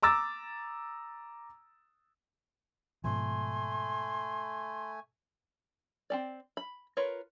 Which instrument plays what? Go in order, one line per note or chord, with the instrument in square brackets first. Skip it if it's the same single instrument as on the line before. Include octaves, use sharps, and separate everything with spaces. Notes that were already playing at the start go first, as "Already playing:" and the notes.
[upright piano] A#5 D6 E6 A6
[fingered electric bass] G#2 B2 F3 [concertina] A3 G#5 [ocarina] C6
[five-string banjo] C4 C#4 D5
B5
F4 A#4 B4 C#5